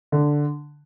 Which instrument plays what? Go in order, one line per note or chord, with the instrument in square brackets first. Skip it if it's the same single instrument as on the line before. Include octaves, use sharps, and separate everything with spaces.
[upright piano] D3